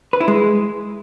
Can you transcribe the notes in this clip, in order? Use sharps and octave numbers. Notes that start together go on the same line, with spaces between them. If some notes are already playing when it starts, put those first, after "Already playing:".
B4
E4
G#3